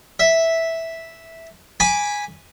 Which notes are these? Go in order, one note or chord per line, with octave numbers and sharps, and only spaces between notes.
E5
G#5 B5 D6